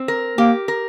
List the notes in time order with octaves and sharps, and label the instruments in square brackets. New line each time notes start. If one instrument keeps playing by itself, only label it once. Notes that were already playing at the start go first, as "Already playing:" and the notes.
Already playing: [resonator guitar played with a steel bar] C4
A#4
[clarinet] A#3 [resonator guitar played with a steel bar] G4
[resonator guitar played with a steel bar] A#4